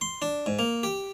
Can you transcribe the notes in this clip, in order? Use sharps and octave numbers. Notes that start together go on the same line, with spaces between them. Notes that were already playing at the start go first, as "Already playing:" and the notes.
C6
D4
G#2
A#3
G4